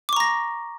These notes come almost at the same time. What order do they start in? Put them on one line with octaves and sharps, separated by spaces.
D6 C#6 A#5 A#6